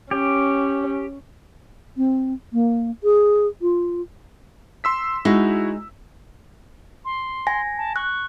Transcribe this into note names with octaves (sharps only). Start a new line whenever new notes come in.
C#4 G4
C4
A#3
G#4
F4
C6 E6 B6
G#3 D#4 E4 F#4
C6
G#5 A#6
A5
C#6 F#6